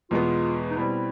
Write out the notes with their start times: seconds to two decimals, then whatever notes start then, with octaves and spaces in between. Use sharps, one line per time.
0.10 E2 B2 G#3 B3 F4
0.71 D#4
0.77 B2 G3 C4 E4